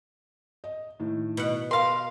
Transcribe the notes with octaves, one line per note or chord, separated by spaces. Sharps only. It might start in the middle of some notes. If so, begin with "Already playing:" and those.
D#5
A2 D#3
B2 F#5
A#4 B4 F5 C6